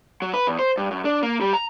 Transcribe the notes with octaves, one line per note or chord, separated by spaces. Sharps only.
F#3
B4
E2
C5
G2
F#2
D4
A#3
G3
A#5